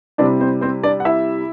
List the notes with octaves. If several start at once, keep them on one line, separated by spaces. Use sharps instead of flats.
C3 G3 C4 D4 E4 D5
C4 C5
C4 C5
D4 D5
F#5
E4 E5